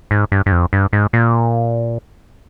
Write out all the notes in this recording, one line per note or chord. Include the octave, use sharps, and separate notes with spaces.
G#2
G2
G2
F2
G2
G#2
A#2